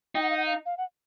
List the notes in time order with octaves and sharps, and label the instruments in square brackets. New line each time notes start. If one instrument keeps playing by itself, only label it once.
[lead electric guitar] D#4 [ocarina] G5
[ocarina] F#5
F5
F#5
F5
F5
F#5